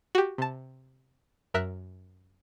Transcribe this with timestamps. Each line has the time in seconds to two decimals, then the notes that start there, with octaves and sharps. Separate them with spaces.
0.15 F#4 G4
0.38 C3 A5
1.54 F#2 A#4 E5 F#6